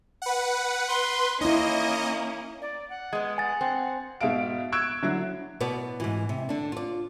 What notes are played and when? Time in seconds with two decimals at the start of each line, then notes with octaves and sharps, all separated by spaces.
0.22 B4 F#5
0.89 B4 C6
1.41 A#3 C#4 D#4 E4 D#5
2.62 D5
2.90 F#5
3.13 G#3 B3 G#6
3.38 G#5 A6
3.61 C4
4.21 G#2 B2 E5 F5 D7
4.72 C#6 E6 F#6 G#6 D7 E7
5.02 D3 F#3 E4
5.60 B2 B3 E4 D5
6.00 G#2 E3
6.29 C3
6.49 D3 D4
6.72 F4 D5